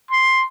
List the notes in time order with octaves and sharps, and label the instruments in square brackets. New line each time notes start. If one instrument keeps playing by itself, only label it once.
[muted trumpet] C6